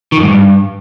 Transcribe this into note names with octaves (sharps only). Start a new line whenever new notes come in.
D#3
F2
G#2
G2